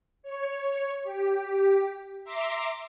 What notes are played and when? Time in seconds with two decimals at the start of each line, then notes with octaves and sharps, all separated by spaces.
0.23 C#5
1.04 G4
2.24 E5 A#5 C6 D6